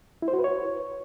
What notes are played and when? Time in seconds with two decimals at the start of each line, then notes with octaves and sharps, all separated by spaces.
0.22 E4
0.28 C5
0.33 F#4
0.39 B4
0.44 C#5